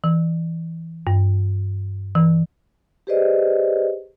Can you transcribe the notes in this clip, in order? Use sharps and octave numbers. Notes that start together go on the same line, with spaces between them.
E3
G2
E3
G4 G#4 B4 C5 D5 D#5